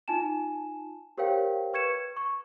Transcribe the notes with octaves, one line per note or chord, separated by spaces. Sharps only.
D#4 F4 G#5 A5 E7
G4 A#4 C5 C#5 F5 G5
B4 C#6 G#6 C#7 E7
C#6